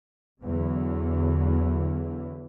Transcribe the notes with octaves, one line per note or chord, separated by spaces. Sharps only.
E2 D3 E3 F#3